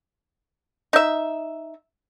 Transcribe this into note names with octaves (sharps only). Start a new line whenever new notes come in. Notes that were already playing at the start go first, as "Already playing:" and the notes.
D#4 E5